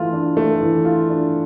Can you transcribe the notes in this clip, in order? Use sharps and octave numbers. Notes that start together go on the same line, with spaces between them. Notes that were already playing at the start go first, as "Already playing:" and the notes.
Already playing: E3 A3 F4
D4
A3
E3
F4
D4